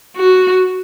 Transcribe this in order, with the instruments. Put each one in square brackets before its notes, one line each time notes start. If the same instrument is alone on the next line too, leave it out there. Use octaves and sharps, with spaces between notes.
[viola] F#4